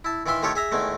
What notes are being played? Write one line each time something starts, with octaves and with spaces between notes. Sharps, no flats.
E4 A5
D#3 E3 F4 E5 C6
D#3 A3 F4 G4 A4 C#5
G#4 E5 A#5
E2 D#3 G#3 A3